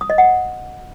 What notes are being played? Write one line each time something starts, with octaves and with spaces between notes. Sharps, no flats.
D#6
D#5
F#5